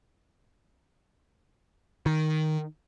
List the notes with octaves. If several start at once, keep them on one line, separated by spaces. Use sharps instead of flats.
D#3